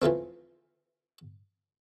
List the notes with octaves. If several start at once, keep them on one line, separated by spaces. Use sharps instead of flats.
E3 F3 A3 C4